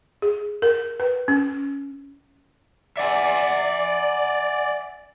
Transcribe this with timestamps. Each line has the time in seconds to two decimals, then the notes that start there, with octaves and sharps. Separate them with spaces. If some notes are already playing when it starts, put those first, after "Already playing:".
0.22 G#4
0.62 A#4
1.00 B4
1.28 C#4
2.97 D5 E5 F#5 G#5